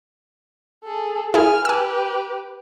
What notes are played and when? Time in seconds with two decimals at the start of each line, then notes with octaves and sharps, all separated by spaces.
0.84 G#4 A4
1.34 E4 G#4 G#5 F6
1.65 G4 B4 G#5 E6